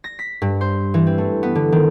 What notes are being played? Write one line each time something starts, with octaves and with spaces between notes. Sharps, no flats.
A#6
B6
G2
C5
E3
C4
A3
B3
D3
D#3